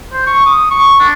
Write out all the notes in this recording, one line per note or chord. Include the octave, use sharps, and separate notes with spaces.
C5
C#6
D#6
C#6
D4